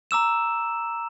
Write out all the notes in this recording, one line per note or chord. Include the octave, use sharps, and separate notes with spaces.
A#5 D6 E6 E7